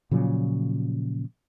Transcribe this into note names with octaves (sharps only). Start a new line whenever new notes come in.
A#2 C#3 F3 F#3